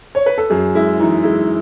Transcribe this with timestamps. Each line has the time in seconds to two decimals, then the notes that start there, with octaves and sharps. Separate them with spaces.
0.15 C#5
0.26 B4
0.38 A4
0.50 F#2 G#4
0.75 G#3 E4
1.00 E3 D#4
1.24 G#3 E4